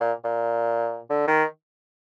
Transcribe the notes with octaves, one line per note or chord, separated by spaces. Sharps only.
A#2
A#2
D3
D#3